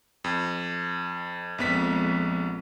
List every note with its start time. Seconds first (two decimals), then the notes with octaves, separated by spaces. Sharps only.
0.24 F2
1.58 A#1 F2 G#3 B3 B6